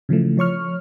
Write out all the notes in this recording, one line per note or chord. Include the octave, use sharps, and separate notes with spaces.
C#3 E3 F3 A3
F3 C#5 C#6 F6